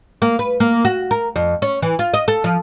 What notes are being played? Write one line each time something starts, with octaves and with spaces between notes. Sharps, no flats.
A#3
B4
A#3
F#4
A#4
F2
C#4
E3
F4
D#5
A4
F3